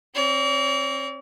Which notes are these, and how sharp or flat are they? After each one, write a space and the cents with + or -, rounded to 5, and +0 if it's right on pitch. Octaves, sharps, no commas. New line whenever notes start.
C4 +30 D5 -45